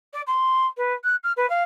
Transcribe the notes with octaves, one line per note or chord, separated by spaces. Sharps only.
D5
C6
B4
F#6
F6
B4
F5